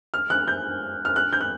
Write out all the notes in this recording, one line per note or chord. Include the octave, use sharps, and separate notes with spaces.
F6
F#6
G6
F6
F#6
G6
F#6